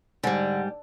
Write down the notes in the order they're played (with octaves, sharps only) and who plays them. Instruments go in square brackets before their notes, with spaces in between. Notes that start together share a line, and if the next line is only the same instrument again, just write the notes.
[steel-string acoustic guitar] G#2 G3 [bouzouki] D3